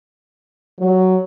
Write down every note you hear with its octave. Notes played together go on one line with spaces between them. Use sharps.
F#3